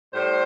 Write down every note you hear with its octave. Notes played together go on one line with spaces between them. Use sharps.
A2 G3 C5